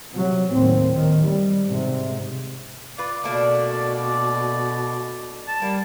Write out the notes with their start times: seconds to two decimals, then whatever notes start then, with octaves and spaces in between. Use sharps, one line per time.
0.14 C3 F#3
0.52 D#2 A2 C4
0.94 D#3
1.26 G3
1.65 G#2 C3
2.98 F4 B4 D5
3.24 B2 A3 A#3 D4
5.48 A5
5.62 G3 A#3